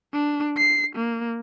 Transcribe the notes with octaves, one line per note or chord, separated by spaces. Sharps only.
D4
C7
A#3